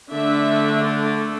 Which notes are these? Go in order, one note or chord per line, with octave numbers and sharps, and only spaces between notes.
D3 A3 D4 E5
A4